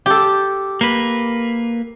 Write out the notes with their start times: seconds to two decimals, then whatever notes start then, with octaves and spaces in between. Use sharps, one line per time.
0.06 G4 A4
0.81 A#3 B4